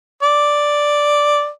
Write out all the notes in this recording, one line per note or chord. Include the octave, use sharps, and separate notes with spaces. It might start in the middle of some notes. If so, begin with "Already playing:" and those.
D5